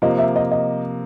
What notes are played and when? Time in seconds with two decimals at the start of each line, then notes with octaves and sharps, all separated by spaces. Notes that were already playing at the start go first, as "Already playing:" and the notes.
0.02 C3 F3 A#3 D#5
0.19 E5
0.36 D#5
0.51 D#5